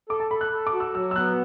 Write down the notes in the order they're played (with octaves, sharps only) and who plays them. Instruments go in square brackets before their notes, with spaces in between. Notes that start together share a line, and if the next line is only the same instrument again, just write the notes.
[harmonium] A4 [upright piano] D6
[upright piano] A5
[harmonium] A4 [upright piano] B5
[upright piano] F#6
[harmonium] A4
[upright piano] D6
[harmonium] F#4
[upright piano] E6
[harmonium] F#3 [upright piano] E6
[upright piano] E6
[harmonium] B3 [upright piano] F#6